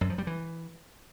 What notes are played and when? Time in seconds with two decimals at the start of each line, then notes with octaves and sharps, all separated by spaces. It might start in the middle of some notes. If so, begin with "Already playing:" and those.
0.01 F#2
0.10 F3
0.18 G3
0.27 E3